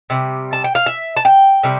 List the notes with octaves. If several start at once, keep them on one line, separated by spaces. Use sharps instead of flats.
C3 G3
A5
G5
F5
E5
A5
G5
C3 G3